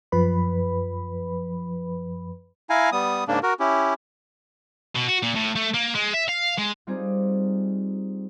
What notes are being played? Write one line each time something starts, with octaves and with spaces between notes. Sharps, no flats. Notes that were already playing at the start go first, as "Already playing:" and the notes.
F#2 F3 B4 B5
E4 F5 G#5 A#5
G3 B3 D#6
G#2 C#3 A#3 D4
F#4 A#4
C#4 E4 G4
B2
F#4
A#2
A2
A3
A#3
G#3
E5
F5
G#3
G3 C4 D#4 F4 G#4